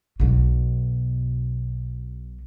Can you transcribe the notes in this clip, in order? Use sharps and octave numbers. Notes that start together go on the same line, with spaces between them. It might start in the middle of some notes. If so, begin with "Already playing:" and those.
B1 B2